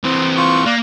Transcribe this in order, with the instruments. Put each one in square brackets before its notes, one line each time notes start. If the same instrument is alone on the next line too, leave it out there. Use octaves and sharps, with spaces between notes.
[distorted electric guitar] E3 C4 [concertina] C6
[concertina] F4 C#6
[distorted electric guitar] A#3 [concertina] D5 F5 F#6